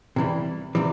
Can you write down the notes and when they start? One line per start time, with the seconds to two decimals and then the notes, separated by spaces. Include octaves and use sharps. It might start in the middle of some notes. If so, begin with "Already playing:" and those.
0.16 C3 E3 G3
0.75 C3 E3 G3